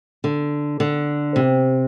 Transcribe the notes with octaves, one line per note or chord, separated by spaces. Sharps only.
D3
D3
C3